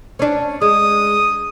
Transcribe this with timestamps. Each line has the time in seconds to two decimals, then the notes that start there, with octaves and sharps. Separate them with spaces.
0.19 C#4 D4
0.62 G#3 D#6